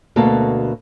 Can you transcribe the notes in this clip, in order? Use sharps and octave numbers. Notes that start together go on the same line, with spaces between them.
D2 B2 A#3 A4 A5